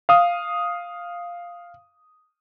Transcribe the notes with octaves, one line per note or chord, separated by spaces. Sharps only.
F5 D#6